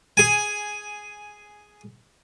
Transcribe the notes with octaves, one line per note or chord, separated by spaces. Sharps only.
G#4 G#5